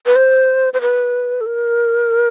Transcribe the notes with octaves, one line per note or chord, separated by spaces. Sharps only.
B4
C5
C5
B4
A4
A#4